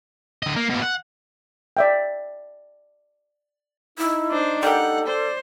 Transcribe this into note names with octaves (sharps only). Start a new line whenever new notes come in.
D3 D#5
A#3
B2 A#3
F#5
D5 E5 G5
D#4 E4
D4 C5
G3 A#3 G4 A4 F#5
C5 D5